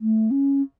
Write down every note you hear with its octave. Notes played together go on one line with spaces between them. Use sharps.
A3
C#4